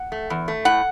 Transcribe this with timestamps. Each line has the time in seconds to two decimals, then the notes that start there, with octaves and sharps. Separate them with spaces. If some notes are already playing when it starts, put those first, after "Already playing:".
Already playing: F#5
0.12 A3
0.30 E2
0.48 A3
0.65 A2 F#5